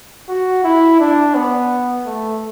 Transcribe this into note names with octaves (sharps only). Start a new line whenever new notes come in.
F#4
E4
D4
B3
A3